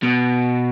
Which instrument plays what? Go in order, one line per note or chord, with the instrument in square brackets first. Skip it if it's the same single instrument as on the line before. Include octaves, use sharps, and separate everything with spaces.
[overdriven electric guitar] B2